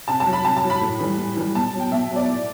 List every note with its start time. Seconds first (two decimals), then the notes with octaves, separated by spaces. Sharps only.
0.08 C3 A5
0.20 A5
0.26 F#3
0.33 B5
0.44 C3 A5
0.56 A5
0.63 F#3
0.70 B5
0.81 A2
1.00 E3 G3
1.18 A2
1.36 E3 G3
1.55 B2 A5
1.74 F#3
1.80 G5
1.91 B2 E5
2.11 F#3
2.16 D5
2.28 A2